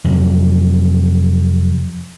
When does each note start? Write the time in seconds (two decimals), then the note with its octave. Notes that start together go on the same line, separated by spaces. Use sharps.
0.04 F2 C3 F#3